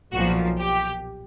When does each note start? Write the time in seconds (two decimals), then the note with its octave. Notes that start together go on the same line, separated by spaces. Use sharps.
0.12 B1 A#2 F3 F#4
0.59 G4